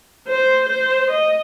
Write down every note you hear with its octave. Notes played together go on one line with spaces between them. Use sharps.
C5
C5
D#5